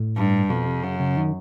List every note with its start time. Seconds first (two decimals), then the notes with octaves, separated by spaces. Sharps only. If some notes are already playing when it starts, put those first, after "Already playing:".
Already playing: A2
0.16 G2
0.49 F2 B2
0.66 C3
0.83 F#2 C#3
1.00 C#3
1.17 D#3